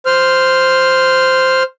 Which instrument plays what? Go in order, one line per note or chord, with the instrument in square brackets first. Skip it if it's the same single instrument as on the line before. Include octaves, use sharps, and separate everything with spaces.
[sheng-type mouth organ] C5 F6